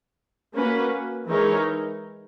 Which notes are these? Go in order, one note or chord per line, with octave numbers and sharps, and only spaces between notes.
A#3 C#4 F#4 B4
E3 G#3 D#4 A#4 C#5